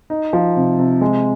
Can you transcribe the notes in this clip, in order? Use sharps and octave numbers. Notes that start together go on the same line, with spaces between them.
D#4
F3
C3
C3
G#3